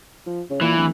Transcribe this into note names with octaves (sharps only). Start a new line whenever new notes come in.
F3
C#3
A#2 E3
D1